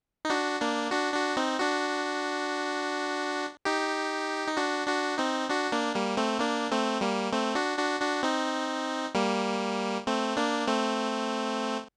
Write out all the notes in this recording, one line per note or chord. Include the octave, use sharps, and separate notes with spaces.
D#4
D4 F#4
A#3 D4
D4 F#4
D4 F#4
C4 D#4
D4 F#4
D#4 G4
D#4
D4 F#4
D4 F#4
C4 D#4
D4 F#4
A#3 D4
G3 A#3
A3 C4
A#3 D4
A3 C4
G3 A#3
A3 C4
D4 F#4
D4 F#4
D4 F#4
C4 D#4
G3 A#3
A3 C4
A#3 D4
A3 C4